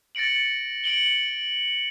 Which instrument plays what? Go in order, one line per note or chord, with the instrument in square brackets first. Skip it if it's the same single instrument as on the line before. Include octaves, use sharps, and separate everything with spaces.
[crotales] A6 A#6 C#7 D7 F#7
C#7 D7 F#7 G7